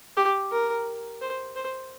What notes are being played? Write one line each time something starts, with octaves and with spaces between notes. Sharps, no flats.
G4
A#4
C5
C5